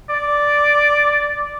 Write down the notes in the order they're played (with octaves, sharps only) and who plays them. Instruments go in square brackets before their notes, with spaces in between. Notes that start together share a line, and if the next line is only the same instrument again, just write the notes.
[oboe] D5